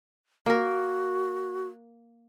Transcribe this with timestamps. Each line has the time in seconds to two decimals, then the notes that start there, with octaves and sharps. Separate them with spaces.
0.46 A#3 F#4 A#4